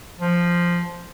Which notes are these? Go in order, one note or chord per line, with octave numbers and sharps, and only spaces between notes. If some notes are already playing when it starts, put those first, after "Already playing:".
F3